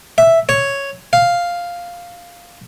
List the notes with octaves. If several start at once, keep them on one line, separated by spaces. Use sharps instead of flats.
E5
C#5
F5